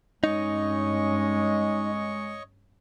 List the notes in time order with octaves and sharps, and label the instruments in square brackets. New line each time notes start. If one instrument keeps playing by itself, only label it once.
[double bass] G2 C#4 [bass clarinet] G#3 [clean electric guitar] D#4 [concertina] C#5 D#5 C#6